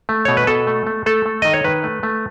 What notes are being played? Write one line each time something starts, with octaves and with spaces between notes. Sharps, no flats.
A3
B2 C#5
B4
B2 A4
A3
A3
A3 A4
A3
D#3 D#5
C#5
D#3 B4
A3
A3